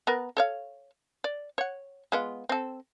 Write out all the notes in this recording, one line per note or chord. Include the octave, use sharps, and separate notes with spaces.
B3 A#4 B4
A4 C#5 F5
D5
C#5 F#5
G#3 B3 F4
C4 A4